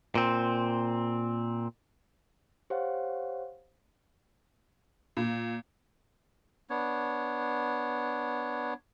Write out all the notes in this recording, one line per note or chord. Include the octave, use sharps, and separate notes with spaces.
A#2 C4
G4 C5 C#5 F5 F#5
A#2
B3 D4 C#5